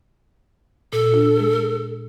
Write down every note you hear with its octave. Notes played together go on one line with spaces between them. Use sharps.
A#2 A4
D4 F4
G#3 G#4